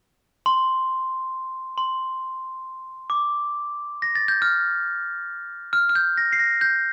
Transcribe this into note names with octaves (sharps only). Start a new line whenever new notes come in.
C6
C6
D6
A#6
A6
G6
F6
F6
F6
G6
A#6
C7
A#6
G6